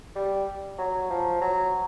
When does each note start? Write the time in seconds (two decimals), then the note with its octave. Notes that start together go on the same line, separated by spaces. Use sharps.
0.15 G3
0.78 F#3
1.10 F3
1.41 F#3